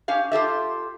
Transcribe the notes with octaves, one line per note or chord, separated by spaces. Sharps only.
C#4 G4 F5
F4 G4 A4 E5